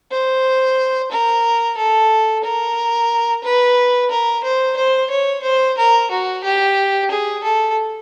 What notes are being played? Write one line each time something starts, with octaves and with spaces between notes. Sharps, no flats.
C5
A#4
A4
A#4
B4
A#4
C5
C5
C#5
C5
A#4
F#4
G4
G#4
A4